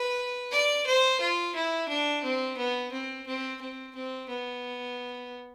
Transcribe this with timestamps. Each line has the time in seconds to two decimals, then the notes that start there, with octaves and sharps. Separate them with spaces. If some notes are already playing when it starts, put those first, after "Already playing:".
Already playing: B4
0.52 D5
0.86 C5
1.20 F4
1.55 E4
1.89 D4
2.24 C4
2.57 B3
2.92 C4
3.27 C4
3.61 C4
3.95 C4
4.29 B3